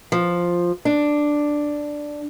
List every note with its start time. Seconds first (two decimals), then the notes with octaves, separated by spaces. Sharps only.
0.12 F3
0.85 D4